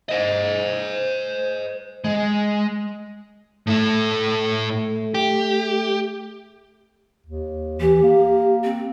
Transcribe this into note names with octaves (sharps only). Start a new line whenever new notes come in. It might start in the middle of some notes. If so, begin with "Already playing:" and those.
C5 D#5
G#3
A2 A3 E4
G4
D#2
E3 G4
A#3
C4